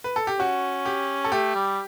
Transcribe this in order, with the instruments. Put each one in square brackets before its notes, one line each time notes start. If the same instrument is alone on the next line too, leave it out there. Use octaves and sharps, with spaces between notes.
[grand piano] B4
A4
G4
[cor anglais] C#4 [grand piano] F#4
[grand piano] G4
A4
[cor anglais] A3 [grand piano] G4
[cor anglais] G3